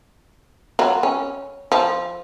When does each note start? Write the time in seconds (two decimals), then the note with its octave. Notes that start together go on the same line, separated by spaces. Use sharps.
0.79 F#3 F4
1.03 C#4
1.72 F3